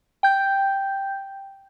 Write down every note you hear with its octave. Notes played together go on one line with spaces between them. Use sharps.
G5 G6